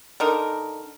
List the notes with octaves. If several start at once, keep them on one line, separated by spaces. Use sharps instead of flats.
D3 D#4 A#4